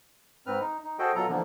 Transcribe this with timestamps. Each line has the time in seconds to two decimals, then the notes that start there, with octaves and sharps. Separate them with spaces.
0.46 G#2 C4 B4 F6
0.60 D#4
0.83 D#4
0.99 F#4 G#4 A4 C5 D#5 G5
1.15 B2 F#3 F4 A4 A#5
1.28 D3 E3 F3 A#3 B3